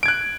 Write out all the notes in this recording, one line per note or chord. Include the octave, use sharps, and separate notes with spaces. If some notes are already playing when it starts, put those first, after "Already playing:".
F#6 G#6 D7